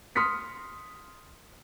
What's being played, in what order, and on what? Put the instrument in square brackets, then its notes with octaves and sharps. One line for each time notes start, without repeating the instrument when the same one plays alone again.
[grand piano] C6 D#6 F6 B6 C#7